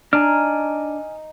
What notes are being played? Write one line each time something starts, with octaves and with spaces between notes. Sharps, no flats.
D4 D#4 G#5 A#5 F6